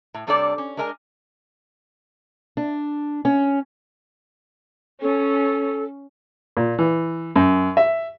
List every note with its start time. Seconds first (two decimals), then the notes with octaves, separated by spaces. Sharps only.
0.14 A2
0.27 C3 G3 D4 A4 C#5 D5
0.58 C#4
0.77 G#3 D4 A#4 D#5 G#5
2.57 D4
3.25 C#4
5.02 C#4 A4
6.57 A#2
6.79 E3
7.36 F#2
7.77 E5